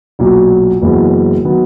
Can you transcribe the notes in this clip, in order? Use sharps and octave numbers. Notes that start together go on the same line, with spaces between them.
B1 A#2 F#3
F#1 F#2 E3 G#3 B3
D#3 F#3 B3